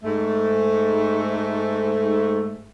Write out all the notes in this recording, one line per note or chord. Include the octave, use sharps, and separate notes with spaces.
G#2 A3